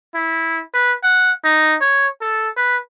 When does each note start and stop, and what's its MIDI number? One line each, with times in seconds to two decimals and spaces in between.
0.15 0.60 64
0.74 0.92 71
1.03 1.31 78
1.44 1.75 63
1.81 2.07 73
2.22 2.48 69
2.57 2.76 71